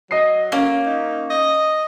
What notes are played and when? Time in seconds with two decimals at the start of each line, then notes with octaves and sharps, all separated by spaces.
0.11 F#3 D#5 C7
0.52 A#3 C#4
0.86 D#4
1.30 D#5